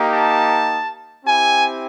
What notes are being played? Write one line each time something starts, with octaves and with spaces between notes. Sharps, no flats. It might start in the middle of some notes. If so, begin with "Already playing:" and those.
Already playing: A#3 D#4 G4
A5
C4 E4 G4 G#5